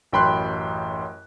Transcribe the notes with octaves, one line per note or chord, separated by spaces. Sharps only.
A1 F#2 G5 B5 C6 F#6